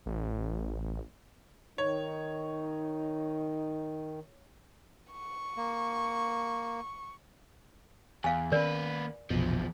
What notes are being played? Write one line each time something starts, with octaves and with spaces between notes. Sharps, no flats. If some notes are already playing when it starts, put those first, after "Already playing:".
A1
D#3 D#4 C#5
C#6
A#3
E2 F5 G#5
D#3 A#3 B3 C#4 A#4 B4 D5
F1 A#1 E2 B2 F3